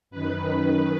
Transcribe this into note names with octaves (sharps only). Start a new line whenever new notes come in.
F#2 D#3 B4